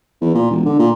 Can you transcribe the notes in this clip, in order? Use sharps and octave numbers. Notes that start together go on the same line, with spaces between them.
E2
A#2
E1
D3
A#2